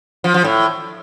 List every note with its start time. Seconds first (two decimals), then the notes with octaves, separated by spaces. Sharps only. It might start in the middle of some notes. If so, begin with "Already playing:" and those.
0.24 F3
0.34 F3
0.44 A2